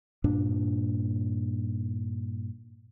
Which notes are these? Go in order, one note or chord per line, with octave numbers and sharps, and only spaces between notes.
G2 A#2 D4